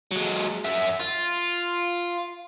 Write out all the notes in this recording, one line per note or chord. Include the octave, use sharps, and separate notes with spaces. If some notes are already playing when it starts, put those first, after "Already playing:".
F#3 G#3
F#2 E5
F4